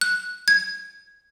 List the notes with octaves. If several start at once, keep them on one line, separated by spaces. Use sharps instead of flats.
F#6
G#6